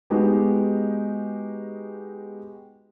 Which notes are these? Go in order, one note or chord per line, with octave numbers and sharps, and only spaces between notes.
G#3 B3 D#4 F#4 G4